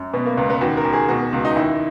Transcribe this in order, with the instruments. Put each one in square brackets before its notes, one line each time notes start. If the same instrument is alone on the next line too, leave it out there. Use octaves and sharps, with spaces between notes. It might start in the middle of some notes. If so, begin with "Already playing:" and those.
Already playing: [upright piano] F#2
B2 B3
A#3
C#2 B3
B3
D#2 F#4
A#4
D#2
G#4
B2 F#4
C#2
D#4
D#2 E4